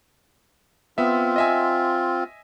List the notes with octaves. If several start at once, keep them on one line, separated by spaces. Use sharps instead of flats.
B3 C4 F4 E5
D#5 E5 G#5